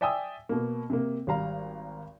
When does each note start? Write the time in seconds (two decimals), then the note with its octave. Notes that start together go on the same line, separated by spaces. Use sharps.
0.01 D5 E5 G5 G#5 D#6 E6
0.49 B2 A#3
0.90 C3 A#3
1.27 G#1 G3 F5 A#5